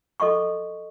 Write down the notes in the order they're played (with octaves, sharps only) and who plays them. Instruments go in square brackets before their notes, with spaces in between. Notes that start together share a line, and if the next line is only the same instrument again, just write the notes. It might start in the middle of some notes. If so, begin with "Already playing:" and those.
[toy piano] A4 D#5 C6 C#6